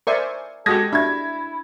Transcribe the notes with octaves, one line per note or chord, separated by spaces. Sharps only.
A#4 C5 D5 E5 G#5 C#6
G#3 F#4 G4 A4 D#6 G#6 A#6
D4 E4 E5 G#6